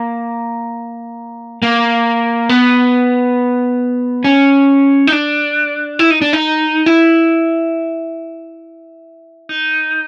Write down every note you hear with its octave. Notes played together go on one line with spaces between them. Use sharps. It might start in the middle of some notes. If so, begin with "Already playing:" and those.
Already playing: A#3
A#3
B3
C#4
D#4
D4
E4
D#4
D4
D#4
E4
D#4